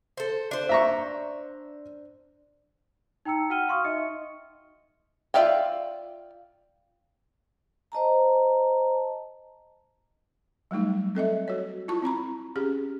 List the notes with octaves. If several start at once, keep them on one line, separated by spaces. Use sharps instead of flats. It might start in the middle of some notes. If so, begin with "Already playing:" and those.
A4 C5
D4 C5
E5 A#5 C#6
D#4 G5 A#5 E6 C#7
F#4 F#5 G5 F6 D#7 G7
F5 C6 C#6 D#6 F6
D#4 D#5 E5 C#7
F4 D5 E5 F5 G5
C5 D#5 A5 A#5
F#3 G3 A3 D#4
C4 A4 D#5 E5
F#4 C#5
E4 F4 A5 C#6
C4 E4 A#5 B5
C#4 G4 G#4